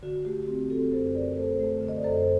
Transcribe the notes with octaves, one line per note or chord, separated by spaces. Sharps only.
D3 F#4
A3 G4
C4 G4
C4 F#4 A4
F#2 A4 C5
D3 A#4 D5
A3 A4 C5
A3
D3
D#5
D5
F#2 A4 C5
C5